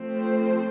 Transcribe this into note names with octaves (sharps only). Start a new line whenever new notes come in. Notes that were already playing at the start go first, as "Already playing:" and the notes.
Already playing: F3 A3 C4
C5